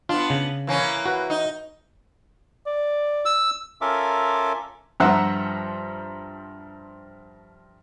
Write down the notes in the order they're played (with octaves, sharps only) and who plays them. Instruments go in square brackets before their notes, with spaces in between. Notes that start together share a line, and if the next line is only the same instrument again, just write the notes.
[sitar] B3 D4 [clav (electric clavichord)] F4
[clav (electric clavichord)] C#3
[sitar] E3 A#3 C#4
[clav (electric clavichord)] F#4 B4
[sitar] D#4
[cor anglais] D5
[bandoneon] E6
[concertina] C#4 F4 A4 A#4 E5 D6
[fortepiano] G2 F3 C5 E5 F#5 A#5